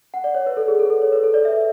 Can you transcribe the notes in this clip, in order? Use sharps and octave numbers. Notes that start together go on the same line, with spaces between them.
F#5
D5
C#5
B4
A4
G#4
A4
A4
C#5
B4
A4
D5
E5